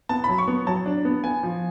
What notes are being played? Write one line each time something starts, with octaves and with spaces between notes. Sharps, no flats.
B3 A5
F#3 B5
C#6
B3
F#3 A5
D4
B3
B3 G#5
F3